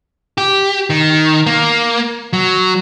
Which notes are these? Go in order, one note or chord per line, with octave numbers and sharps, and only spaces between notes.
G4
D#3
A#3
F#3